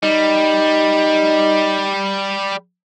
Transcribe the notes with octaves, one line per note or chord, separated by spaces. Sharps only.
G3 D#4